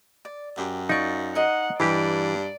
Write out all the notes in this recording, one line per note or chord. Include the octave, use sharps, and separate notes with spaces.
D5
F#2 G4
D#4 F4 D5 C#6
A#4 D#5 F#5 C6
G2 E3 G4 D5